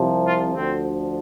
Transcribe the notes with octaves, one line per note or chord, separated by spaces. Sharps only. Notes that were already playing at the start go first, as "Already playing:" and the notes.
Already playing: C2 C3 F3
F4
D2 D3 F3 C4